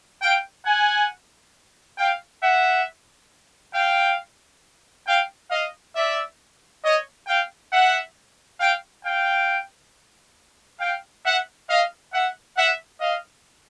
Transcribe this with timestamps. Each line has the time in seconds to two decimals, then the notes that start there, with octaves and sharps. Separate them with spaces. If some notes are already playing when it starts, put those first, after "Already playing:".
0.22 F5 G5
0.66 F#5 G#5
1.98 F5 G5
2.42 E5 F#5
3.75 F5 G5
5.07 F5 G5
5.51 D#5 F5
5.95 D5 E5
6.84 C#5 D#5
7.27 F5 G5
7.72 E5 F#5
8.60 F5 G5
9.04 F5 G5
10.80 F5 G5
11.25 E5 F#5
11.69 D#5 F5
12.13 E5 F#5
12.57 E5 F#5
13.01 D#5 F5